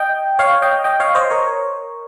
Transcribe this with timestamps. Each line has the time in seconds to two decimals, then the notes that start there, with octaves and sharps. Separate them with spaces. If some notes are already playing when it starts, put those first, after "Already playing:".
Already playing: D#5 G5
0.39 C#5 F5
0.62 D#5 G5
0.84 D#5 G5
1.00 C#5 F5
1.15 C5 D#5
1.30 A#4 C#5